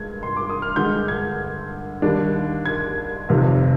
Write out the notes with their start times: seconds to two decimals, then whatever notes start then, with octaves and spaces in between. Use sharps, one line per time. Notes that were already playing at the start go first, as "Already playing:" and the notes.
Already playing: G2 G#3 G#6
0.23 C6
0.36 D6
0.50 D#6
0.62 F6
0.76 G2 D3 G#3 G6
1.08 G#6
2.02 D#2 D#3 G3 D4
2.66 G#6
3.29 F1 F2 C3 D#3